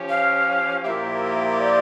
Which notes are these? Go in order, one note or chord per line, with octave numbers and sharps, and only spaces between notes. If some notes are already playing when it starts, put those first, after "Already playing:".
Already playing: F3 C#4 G4
F5
A#2 F3 A#3 E4 G4 E5
D5